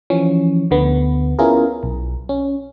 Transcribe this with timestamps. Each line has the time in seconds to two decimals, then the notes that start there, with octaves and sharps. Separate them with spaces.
0.10 E3 F3 C#4
0.71 D2 D3 B3
1.39 B3 C#4 E4 F4 G#4 A#4
1.83 B1
2.29 C#4